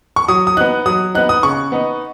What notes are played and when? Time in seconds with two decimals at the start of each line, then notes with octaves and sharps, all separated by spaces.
0.16 C#6
0.28 F#3 D#6
0.47 D#6
0.57 B3 D#4 F#6
0.86 F#3 D#6
1.15 B3 D#4 F#6
1.29 D#6
1.43 C#3 C#6
1.72 B3 D#4